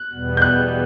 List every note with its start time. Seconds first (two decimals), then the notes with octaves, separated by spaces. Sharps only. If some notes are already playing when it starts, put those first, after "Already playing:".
Already playing: F#6
0.13 E2 B2 G3 B3
0.37 G6
0.42 F#6